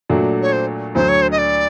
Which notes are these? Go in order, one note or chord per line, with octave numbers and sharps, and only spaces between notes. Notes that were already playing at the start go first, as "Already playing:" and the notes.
A#2 F#3 A3 D4 F#4
C#5
C5
D2 D3 F#3 C5
C#5
C5
D#5
D5